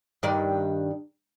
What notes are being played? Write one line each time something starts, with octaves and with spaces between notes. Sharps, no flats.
G2 D#3 D5